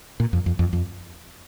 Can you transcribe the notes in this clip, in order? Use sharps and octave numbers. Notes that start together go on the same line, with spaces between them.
A#2
F2
F2
F2
F2